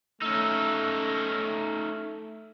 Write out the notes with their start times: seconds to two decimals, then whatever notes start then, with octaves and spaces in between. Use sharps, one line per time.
0.22 A3 C#4 D#4 E6